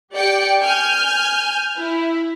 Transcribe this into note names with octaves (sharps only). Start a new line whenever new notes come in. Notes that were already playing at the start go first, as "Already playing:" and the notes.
G4 D5 G5 C#7
G#5 F6 G6
E4